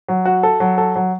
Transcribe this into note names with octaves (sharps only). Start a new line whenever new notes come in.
F#3
F#4
A4
F#3
A4
F#3